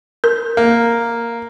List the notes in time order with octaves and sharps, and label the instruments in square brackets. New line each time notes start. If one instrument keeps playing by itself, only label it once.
[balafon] A#4
[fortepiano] A#3